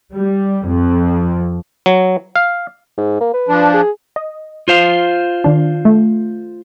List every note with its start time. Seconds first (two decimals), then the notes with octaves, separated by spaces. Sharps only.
0.12 G3
0.66 F2
1.86 F#3
2.36 F5
2.98 G#2
3.20 A#3
3.34 B4
3.48 F3 D4
3.74 G#4
4.16 D#5
4.68 F4 C5 F5
5.44 D#3 D4
5.85 A3